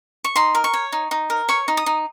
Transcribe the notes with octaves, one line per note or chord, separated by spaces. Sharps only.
C#6
D#4 C6
A#4
C#6
C#5
D#4
D#4
A#4
C#5 C#6
D#4
D#6
D#4